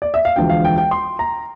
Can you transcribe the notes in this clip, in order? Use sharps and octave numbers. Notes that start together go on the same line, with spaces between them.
D5
E5
F5
E1 D2 D3 F3 G5
F5
G5
G5
C6
A#5